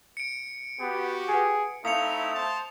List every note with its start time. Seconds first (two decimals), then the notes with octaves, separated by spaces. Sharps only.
0.17 C#7 D7
0.80 B3 F#4 G4
1.29 G#4 B4 F#5 G#5
1.85 A3 C4 D#4 E4 F5 D#6 C#7 F7
2.34 C5 A5